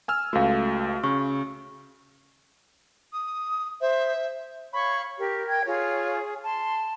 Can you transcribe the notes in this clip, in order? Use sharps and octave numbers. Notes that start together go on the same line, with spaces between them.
G#5 E6 F6
C#2 A3 F#4 F5
C#3 C#6
D#6
C5 E5
C#5 F5 B5 C#6
G4 A#4
G5 G#6
F4 G#4 C#5
A5 C6